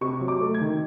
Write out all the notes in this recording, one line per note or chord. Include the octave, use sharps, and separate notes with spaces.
C3 C#6
F#3
D6
A3
G#6
D#3